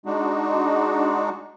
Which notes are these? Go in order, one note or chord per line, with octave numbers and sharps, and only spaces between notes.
G#3 D4 D#4 F#4